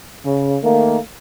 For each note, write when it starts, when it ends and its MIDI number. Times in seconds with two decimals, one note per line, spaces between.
0.24 0.56 49
0.63 0.98 51
0.63 0.98 57
0.63 0.98 58